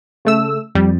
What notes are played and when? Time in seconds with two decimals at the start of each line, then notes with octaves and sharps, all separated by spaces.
0.25 C#3 A3 E6
0.75 F2 G3